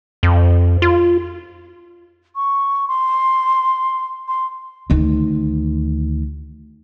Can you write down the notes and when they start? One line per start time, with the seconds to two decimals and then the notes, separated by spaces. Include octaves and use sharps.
0.23 F2
0.82 F4
2.36 C#6
2.88 C6
4.28 C6
4.90 D2 D#3